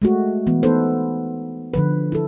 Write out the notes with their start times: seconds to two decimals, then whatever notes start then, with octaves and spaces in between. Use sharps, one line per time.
0.02 G#3 A3 F#4
0.47 E3 B3
0.63 B3 D#4 A4 B4 C5
1.74 D3 F3 B4
2.12 E4 A4